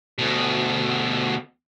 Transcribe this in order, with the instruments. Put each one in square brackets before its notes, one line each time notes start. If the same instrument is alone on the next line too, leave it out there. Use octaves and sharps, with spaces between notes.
[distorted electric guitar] D2 B2